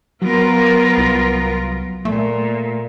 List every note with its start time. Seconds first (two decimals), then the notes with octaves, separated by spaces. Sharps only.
0.22 F#3 B3 F4 A#4
0.97 C2
2.05 A#2 A3